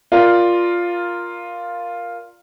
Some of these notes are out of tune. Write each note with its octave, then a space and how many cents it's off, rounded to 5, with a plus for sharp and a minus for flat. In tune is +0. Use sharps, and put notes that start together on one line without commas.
F4 +0 A#4 +5 D5 +5